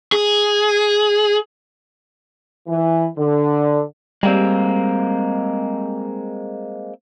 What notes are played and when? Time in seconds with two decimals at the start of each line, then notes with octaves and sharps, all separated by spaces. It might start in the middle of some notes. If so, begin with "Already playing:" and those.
0.12 G#4
2.67 E3
3.17 D3
4.23 G3 G#3 A#3 C4